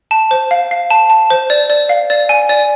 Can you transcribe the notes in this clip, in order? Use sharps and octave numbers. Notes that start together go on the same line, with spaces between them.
A5
C5
F5
F5
A5
A5
C5
D5
D5
F5
D5
G#5
D5